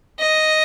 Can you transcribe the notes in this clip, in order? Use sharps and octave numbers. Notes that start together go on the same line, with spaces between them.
D#5